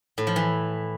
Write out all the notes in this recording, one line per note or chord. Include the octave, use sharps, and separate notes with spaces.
A2
F3
E3